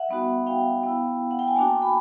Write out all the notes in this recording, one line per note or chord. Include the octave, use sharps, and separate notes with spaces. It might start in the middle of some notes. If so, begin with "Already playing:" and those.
Already playing: E5 F#5
G3 B3 D#4 F#4
F5 G5
B3 E4
F#5
G5
G#5
A#3 D4 F#4 G5 A5
C6
B5